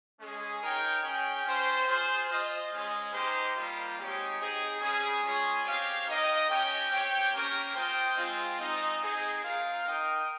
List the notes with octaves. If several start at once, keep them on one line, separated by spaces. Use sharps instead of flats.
G#3 C#4 G#4
D#4 A#4 C#5 G5
C#4 G#4 C#5 G5
C#4 F4 C5
F4 G#4 C5
F4 C5 D#5
G#3 C#4 G#4
A#3 D#4 G4 C5 D#5
G3 A#3 F4
G#3 C4 D#4 G4 C#5
C4 D#4 G#4
G3 C#4 G#4
G#3 C#4 F4 G#4 C#5
C4 G4 C#5 F5
D#4 A#4 D#5 G5
C#4 G4 C#5 G5
C4 G4 C#5 G5
A#3 C#4 G4 A#4
F4 C5 D#5 G5
G#3 C4 F4
G#3 C4 D#4
C4 D#4 G#4
C4 F4 A#4 F5
D#4 A#4 D#5 G5